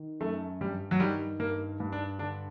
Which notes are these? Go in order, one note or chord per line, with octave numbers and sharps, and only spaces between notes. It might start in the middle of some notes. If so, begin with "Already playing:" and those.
Already playing: D#3
F#2 A3
G2 G3
F#3
D#3 G3
G2 A#3
G2
D4
D3 D4